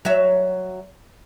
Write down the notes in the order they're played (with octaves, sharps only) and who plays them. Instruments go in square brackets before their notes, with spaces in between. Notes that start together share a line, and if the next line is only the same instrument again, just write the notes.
[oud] F#3 C#5 E5